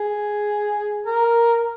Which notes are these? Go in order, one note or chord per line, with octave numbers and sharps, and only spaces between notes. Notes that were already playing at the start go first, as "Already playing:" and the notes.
Already playing: G#4
A#4